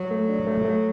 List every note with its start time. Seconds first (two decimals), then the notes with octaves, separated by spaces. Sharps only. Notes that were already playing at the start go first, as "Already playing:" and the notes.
Already playing: F#3
0.11 A3
0.29 D4
0.47 A3
0.65 A3